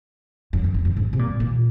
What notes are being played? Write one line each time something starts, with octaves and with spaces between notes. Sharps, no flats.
F#2
F2
F#2
F#2
G#2
C3
A#2
A#2